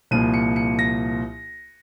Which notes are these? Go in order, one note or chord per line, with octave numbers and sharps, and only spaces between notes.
C2 A#2 F3 A#3 D#7
C#7
C#7
A#6